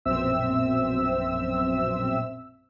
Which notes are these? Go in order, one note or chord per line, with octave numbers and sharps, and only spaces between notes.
A#1 F#2 B2 C4 E5 E6